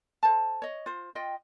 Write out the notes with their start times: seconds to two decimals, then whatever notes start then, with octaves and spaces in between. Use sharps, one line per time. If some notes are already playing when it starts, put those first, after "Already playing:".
0.23 A4 C5 A5
0.62 C#5 D#5
0.86 F4 C5
1.15 F4 D#5 G5